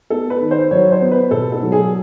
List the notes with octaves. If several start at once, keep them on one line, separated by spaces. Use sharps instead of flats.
B3 A4
B4
D#3
C5
F#3 C#5
C5
B3
B4
B2 A4
A4
F#3
G#4